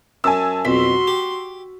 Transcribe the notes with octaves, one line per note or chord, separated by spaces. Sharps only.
F#2 G#5 A5 E6
B1 F2 F#4 C6 B6
G4